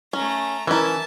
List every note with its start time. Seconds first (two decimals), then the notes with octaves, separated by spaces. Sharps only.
0.13 A3 C#4 A#5
0.67 E3 C#4 E4 A#4 E5 A5 E6